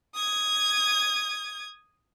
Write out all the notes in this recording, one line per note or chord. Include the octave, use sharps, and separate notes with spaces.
D#6 G#6